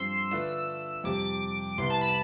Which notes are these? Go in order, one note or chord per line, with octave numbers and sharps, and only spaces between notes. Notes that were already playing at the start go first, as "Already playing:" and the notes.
Already playing: G2 F3 C4 C6 E6
D3 A3 D4 F4 B4 E6
F2 C3 G3 D6
C2 C3 G3 B3 E4 C6
A5
B5